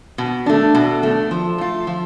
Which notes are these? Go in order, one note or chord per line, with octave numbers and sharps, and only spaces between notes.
B2
A3 D4
B2
A3 D4
F3
A3 F4
F3